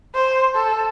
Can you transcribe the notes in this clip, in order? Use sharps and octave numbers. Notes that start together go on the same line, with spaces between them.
C5
A4